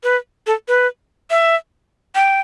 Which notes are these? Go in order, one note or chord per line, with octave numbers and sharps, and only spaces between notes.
B4
A4
B4
E5
G5